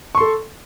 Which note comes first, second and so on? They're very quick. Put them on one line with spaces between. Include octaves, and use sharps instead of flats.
C#6 C6 A4